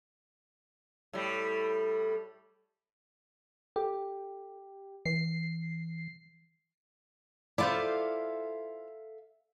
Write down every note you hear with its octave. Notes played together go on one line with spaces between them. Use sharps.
A2 G3
G4 A4
E3 C7
E4 F4 A4 C5 D5 E5 F5